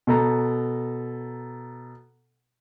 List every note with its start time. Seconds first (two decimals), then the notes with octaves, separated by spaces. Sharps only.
0.07 B2 A4 A#5